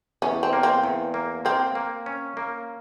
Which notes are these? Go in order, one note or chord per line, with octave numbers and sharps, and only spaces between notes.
E2 C#4
C4
A#3
C4
E2
A#3
A#3 C4
A#3
C#4
A#3